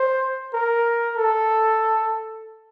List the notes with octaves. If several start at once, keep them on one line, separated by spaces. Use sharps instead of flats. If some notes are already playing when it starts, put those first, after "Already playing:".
Already playing: C5
A#4
A4